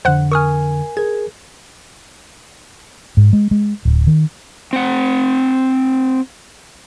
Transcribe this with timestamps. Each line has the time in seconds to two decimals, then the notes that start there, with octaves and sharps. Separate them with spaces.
0.05 F2 D3 C5 F#5 F#6
0.32 A#4 G#5 C#6 D#6 F6
0.97 G#4 A#4 G#6
3.17 G#2
3.33 G#3
3.51 G#3
3.85 D1
4.07 D#3
4.73 C4 F#5